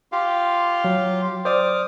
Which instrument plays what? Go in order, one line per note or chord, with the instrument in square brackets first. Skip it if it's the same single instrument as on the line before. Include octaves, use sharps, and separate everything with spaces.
[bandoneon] F4 G4 F5
[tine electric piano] F#3
[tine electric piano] C5 D5 [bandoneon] D6 D#6 F6